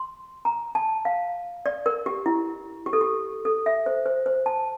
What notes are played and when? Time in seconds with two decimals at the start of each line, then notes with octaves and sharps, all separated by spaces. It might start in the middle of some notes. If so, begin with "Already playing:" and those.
Already playing: C6
0.45 A#5
0.75 A5
1.05 F5
1.66 D5
1.86 A#4
2.06 G4
2.26 E4
2.86 G4
2.93 A4
3.01 G4
3.45 A4
3.66 E5
3.86 C5
4.06 C5
4.26 C5
4.46 A5